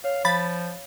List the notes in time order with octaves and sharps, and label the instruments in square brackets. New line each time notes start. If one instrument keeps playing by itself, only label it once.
[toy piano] C#5 [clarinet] F5
[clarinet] F3 [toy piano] F5 [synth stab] B5 A6